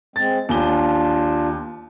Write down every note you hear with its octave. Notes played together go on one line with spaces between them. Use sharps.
G#3 C4 A6
D#2 D4 F4 G#5 G7